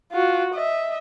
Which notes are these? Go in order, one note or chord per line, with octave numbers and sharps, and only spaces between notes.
F4 F#4
D#5 E5